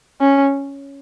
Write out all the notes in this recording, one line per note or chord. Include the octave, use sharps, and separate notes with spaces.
C#4